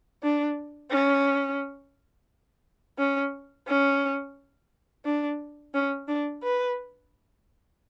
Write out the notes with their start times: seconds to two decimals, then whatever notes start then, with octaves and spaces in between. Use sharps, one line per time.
0.23 D4
0.91 C#4
2.98 C#4
3.67 C#4
5.05 D4
5.74 C#4
6.08 D4
6.43 B4